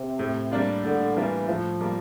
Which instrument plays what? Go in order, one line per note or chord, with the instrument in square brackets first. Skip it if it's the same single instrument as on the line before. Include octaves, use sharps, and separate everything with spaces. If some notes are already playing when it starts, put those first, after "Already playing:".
Already playing: [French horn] C3
[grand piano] A2
G3 A#3 D4 F4
[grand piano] A2 [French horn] D3
[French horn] E3 [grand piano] G3 A#3 D4 F4
[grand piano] A2 [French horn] F3
[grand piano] G3 A#3 F4